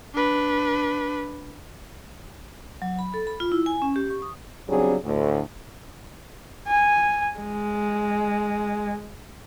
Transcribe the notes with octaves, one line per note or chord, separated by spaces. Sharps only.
D4 B4
F#3
B5
A4
B5
F4
E4
G#5
C#4
G4
C#6
D#6
C#3 F#3 G3 C4 D4 G#4
D2 A2
G#5
G#3